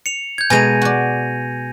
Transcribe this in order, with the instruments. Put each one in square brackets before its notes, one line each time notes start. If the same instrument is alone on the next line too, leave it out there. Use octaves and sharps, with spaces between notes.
[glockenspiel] C#7 F7
G6 G#6
[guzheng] B2 G#3 A#5 [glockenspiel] G#5 A#6 D#7
[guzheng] F#4 D5